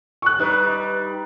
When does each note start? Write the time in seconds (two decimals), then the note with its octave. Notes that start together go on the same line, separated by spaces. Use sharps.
0.22 C#6 F#6
0.39 G3 D#4 B4